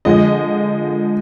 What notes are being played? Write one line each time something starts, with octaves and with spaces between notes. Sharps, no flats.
D3 F3 G#3 D#5